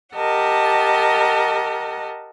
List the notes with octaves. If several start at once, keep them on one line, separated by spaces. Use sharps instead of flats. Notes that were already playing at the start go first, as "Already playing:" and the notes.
G4 A#4 D#5 F#5 A5